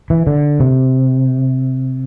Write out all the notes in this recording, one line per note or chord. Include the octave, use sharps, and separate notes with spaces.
E3
D3
C3